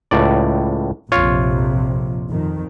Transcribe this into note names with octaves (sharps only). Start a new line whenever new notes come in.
C#2 A2 D5
A#1 F2 C3 F4 C#5
F2 D#3